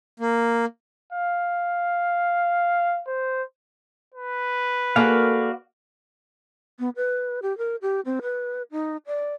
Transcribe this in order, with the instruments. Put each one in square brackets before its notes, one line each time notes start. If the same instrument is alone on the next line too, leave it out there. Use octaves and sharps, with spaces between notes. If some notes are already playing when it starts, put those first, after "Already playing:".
[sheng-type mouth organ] A#3
[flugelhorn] F5
C5
[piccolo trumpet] B4
[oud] A#3 G#4 A4 [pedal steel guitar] F#4 D5 F5
[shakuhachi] B3
B4
G4
A#4
G4
C4
B4
D#4
D5